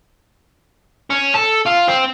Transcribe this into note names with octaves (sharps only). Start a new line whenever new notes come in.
C#4
A4
F4
C4